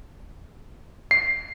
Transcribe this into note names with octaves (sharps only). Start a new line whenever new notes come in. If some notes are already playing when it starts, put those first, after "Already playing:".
C7